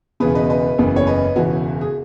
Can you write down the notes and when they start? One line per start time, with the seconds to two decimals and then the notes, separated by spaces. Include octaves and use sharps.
0.20 E1 E2 C#3 G#4 B4
0.35 B4 D#5
0.50 B4 D#5
0.78 F#1 E2 C#3
0.96 C#5
1.07 B4 D#5
1.36 E1 E2 C#3 E3 F#4
1.81 G#4